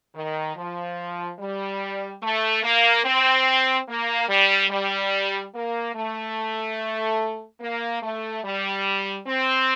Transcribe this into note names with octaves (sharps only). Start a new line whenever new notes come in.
D#3
F3
G3
A3
A#3
C4
A#3
G3
G3
A#3
A3
A#3
A3
G3
C4